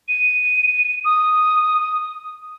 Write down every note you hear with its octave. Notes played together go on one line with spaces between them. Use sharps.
D#7
D#6